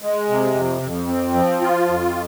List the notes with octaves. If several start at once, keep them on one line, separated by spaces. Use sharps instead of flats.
G#3
C3
F2
F2
C4
F3
F4
F2